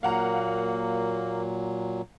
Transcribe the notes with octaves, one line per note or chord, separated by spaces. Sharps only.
A#2 F#3 A#3 F5 F#5 A#5